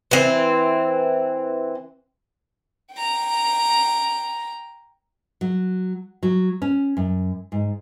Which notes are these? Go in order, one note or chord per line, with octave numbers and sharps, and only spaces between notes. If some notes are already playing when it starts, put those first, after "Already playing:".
E3 C4
G5 A#5
F#3
F#3
C#4
F#2
G#2